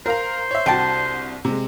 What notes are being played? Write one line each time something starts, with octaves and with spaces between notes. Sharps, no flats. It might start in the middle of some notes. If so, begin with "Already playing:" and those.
A#4 C5 F5 A#5
C#5 E5
C2 D3 F#4 G5 A5
C3 G#3